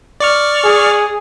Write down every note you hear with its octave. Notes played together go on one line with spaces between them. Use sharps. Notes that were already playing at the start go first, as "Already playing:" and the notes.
D5 C#6 F6
G#4